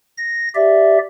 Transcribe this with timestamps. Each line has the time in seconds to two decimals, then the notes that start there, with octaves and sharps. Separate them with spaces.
0.17 A#6
0.55 G4 D5 E5